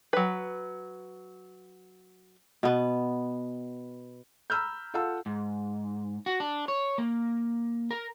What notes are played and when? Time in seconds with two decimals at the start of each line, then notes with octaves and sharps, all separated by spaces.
0.13 F#3 B4
2.63 B2 B3
4.50 A#5 B5 E6 F6 G6
4.94 F4 A4 F5 F#5 A5 E6
5.26 G#2
6.26 F#4
6.40 D4
6.68 C#5
6.98 A#3
7.91 A#4